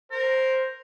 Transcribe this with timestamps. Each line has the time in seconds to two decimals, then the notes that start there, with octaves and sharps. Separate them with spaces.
0.12 A#4 C5